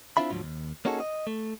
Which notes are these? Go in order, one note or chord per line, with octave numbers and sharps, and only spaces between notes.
C4 D4 E4 F4 E5 B5
D2 G#2 D3 F3 F#3
D#2
A#3 C#4 D#4 F#4 G#4 A4
D#5
A3